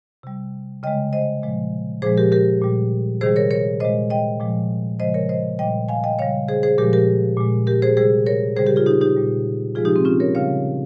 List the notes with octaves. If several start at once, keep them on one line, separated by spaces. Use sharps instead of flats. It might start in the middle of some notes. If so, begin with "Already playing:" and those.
C3 G3
C#3 G#3 D#5 G5
C5 D#5
A#2 F3 G#3
A#2 F3 G#3 G#4 C5
G4 A#4
G4 A#4
A#2 G3
C3 D#3 G3 G#4 C5
A#4 C#5
A#4 C#5
A#2 G#3 C5 D#5
D#5 G5
A#2 F3 G#3
C#3 F3 G#3 C5 D#5
A#4 C#5
C5 D#5
A#2 G3 D#5 G5
F5 G#5
D#5 G5
C#3 G3 C#5 F5
G#4 C5
G#4 C5
A#2 F3 G#3 G4 A#4
G4 A#4
A#2 G#3
G4 A#4
G#4 C5
C3 G3 G#4 C5
A#4 C#5
C#3 G3 G#4 C5
G4 A#4
F4 G#4
D#4 G4
D#4 G4
A#2 G3
C3 F3 G#3 F4 G#4
D#4 G4
C4
C#4 F4
A#4 C#5
C#3 G3 C#5 F5